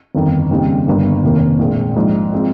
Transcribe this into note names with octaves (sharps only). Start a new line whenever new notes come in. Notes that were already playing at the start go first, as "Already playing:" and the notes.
G1 F2 D#3
D#2 C#3 G3 C4 D#4
G1 G2 D#3 A#3
F1 D#2 D#3 A#3
A#1 A#2 G#3
A#1 G#2 F3
F3 G#3 C4 F4